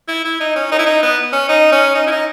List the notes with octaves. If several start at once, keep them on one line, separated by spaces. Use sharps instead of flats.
E4
E4
D#4
C#4
D#4
E4
D#4
B3
C#4
D#4
C#4
D#4
E4
D#4